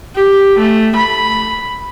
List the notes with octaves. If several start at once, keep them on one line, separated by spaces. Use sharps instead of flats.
G4
A3
B5